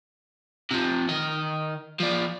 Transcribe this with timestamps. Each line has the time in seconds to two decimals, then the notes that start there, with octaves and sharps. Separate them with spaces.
0.71 C3 F3
1.09 D#3 D#5
2.00 F3 D5